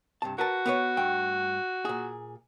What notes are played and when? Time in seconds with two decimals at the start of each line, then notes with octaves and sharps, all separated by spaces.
0.22 G2 C3 A5
0.38 F#4 A#4 B4 A5
0.66 B3 B4 C#5
0.97 G2 A3 G5
1.85 A#2 G#4